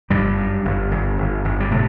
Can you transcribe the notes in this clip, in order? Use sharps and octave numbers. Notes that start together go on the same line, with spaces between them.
G1 G2 G3
F#2
G1
G1
G1
G1
G3
A2 C3 A3